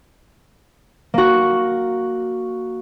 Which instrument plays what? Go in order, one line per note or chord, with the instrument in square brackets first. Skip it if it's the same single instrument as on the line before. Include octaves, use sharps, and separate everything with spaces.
[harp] A#3 F#4